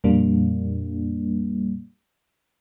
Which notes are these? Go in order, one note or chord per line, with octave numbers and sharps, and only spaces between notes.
F2 A#2 G3 A#3 D4